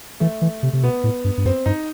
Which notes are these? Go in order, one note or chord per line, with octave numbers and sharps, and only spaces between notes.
E3 A3
E3
C3
C3
B2 B3
A2
G2
G2
F#2 C4
G2 D#4